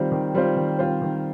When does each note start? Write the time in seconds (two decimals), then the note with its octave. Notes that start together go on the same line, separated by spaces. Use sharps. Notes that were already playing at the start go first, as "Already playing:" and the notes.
Already playing: D#3 G3 C4 F4 C5
0.12 D#3
0.35 G3 C4 F4 C5
0.56 D#3
0.79 G3 C4 F4 C5
1.02 D#3